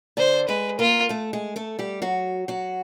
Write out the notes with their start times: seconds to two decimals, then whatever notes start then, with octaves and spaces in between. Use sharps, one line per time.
0.17 D3 D4 C5
0.48 G#3 G#4 B4
0.79 A#3 F4 A#4
1.09 A3 A4
1.33 G#3 G#4
1.56 A3 A4
1.79 G3 G4
2.02 F#3 F#4
2.48 F#3 F#4